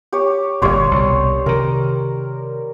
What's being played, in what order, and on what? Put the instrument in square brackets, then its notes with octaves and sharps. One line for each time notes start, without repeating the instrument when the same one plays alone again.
[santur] G4 C#5
[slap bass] G1 G2 A#2 [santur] G3 C#5 C6
[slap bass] C2 B2
[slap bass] C3 D#3 [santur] A#4